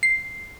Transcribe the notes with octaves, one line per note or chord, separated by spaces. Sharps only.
C7